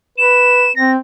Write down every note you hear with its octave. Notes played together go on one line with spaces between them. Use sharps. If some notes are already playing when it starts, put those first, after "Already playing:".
B4 E7
C4 A#6